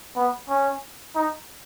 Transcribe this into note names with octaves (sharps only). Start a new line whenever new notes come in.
B3
C#4
D#4